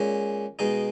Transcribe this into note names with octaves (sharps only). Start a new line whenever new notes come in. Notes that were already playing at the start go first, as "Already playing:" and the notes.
Already playing: A#2 G#3 C#4
B2 G#3 D#4